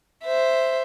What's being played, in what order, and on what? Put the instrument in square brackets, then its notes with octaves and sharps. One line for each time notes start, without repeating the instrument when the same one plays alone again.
[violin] C5 E5